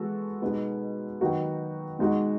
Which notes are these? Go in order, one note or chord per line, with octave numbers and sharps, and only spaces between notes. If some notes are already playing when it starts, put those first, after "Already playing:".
Already playing: E3 G#3 B3 F#4 A4
B2 G#3 B3 D#4
D#3 F#3 B3 D#4 F#4
B2 G#3 D#4 F#4